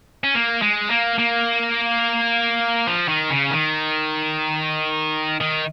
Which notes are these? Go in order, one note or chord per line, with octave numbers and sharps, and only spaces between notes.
C#4
A#3
G#3
A#3
A#3
F3
D#3
C#3
D#3
D#3